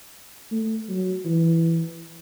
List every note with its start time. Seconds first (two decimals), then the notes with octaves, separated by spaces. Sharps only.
0.52 A3
0.89 F#3
1.25 E3